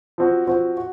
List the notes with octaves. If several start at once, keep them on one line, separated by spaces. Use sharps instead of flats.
F3 C4 F#4
F3 C4 F#4
F#4